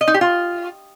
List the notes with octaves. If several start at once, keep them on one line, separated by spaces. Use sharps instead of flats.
D#5
D#4
G4
F4